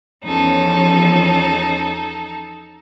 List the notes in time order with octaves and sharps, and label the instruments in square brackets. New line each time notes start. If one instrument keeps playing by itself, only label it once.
[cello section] E2 F3 C#4 [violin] D#4 A4